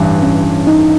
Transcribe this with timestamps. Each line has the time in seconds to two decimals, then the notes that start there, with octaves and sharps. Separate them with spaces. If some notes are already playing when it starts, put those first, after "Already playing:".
Already playing: A1 G2 E3
0.23 C#4
0.67 D#4